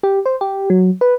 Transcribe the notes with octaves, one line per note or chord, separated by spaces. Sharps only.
G4
C5
G4
F#3
B4